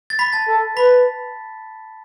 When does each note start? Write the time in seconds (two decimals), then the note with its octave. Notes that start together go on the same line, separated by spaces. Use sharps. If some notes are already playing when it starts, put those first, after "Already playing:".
0.10 A6
0.19 B5 B6
0.33 A5 A6
0.48 A4
0.77 B4 B5 B6